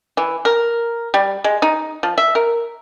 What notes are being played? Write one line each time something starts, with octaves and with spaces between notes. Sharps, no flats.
E3
A#4
G3
G#3
D#4
F3
E5
A#4